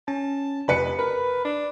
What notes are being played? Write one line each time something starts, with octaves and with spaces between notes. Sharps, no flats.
C#4 A5
F1 B4 B5 C#7
A#4 B4
D4